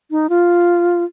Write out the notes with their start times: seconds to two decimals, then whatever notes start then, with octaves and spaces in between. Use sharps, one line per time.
0.11 D#4
0.29 F4